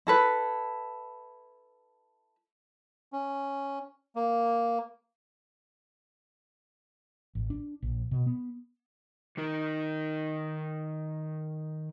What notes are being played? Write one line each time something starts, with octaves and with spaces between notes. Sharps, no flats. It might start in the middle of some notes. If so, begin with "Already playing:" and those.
E4 A4 B4
C#4
A#3
A1
D4
A#1
B2
B3
D#3 D#4 A#4